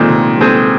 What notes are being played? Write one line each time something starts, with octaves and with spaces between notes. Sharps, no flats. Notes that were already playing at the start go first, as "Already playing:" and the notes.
Already playing: A#2 D#3 G#3 C4 G#4 C5
C3
G#3 C4 G#4 C5